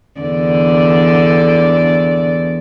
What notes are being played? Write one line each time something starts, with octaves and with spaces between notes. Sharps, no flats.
E2 D3 D5